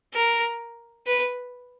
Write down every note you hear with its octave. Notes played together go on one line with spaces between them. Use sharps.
A#4
B4